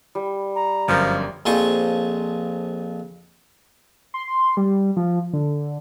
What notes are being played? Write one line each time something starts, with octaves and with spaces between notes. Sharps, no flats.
G3
A#5
G1 F#2 F3 A#4
A#1 F2 F4 C5 G#5 C#6
C6
G3
F3
D3